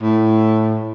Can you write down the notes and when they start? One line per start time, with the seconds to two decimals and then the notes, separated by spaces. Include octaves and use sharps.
0.02 A2